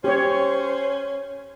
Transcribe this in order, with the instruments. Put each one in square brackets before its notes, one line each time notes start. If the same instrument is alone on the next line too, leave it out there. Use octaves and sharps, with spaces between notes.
[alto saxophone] C#4 [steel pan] G4 C#5 [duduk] C5